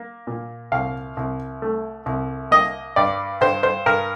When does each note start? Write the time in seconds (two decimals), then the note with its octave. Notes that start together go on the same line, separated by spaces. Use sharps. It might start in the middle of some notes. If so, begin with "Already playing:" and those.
Already playing: A#3
0.27 A#2
0.72 C2 F5
1.17 C2
1.62 A3
2.06 C2
2.51 A#3 D#5
2.96 G2 D5
3.41 G2 C5
3.63 C5
3.86 G2 A#4